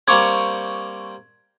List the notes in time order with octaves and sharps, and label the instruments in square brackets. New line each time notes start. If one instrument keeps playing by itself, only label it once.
[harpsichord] G3 A#3 C4 [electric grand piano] C#6 D6 G#6